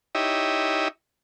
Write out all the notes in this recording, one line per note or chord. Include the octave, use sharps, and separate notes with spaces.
D#4 E4 G4 C#5 D#5 E5